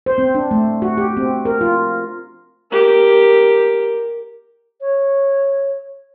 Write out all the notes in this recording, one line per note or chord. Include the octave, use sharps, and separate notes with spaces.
C5
C4
D4
A3
F#4
G4
C4
A#4
F4
G4 A#4
C#5